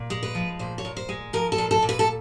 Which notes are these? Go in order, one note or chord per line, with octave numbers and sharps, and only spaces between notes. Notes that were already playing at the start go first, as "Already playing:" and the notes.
Already playing: A#2
G#3
B4
F3
A#2 C5
C#5
A#2
C5
G#3
F3 A#4
A4
A#2
A4
A#2
B4
A4